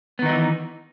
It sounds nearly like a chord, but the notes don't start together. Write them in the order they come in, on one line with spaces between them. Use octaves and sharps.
B3 D#3 D#4 F#3 E3